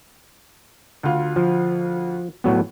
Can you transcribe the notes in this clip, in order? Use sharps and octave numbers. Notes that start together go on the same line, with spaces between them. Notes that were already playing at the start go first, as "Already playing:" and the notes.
D2 F4
F3
A2 F#3 B3